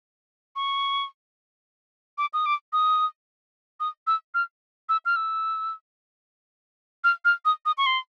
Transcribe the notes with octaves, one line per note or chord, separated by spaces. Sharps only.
C#6
D6
D#6
D6
D#6
D#6
E6
F6
E6
F6
E6
F6
F6
D#6
D#6
C#6
C6